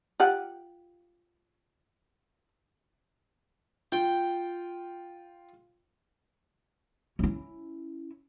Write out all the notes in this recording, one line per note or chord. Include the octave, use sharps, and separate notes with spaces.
F4 G4 F#5
F4 G5
C#4 E4